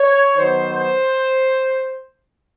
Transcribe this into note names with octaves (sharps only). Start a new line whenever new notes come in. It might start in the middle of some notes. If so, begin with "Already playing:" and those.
Already playing: C#5
D#3 F#3 B3 C5
C5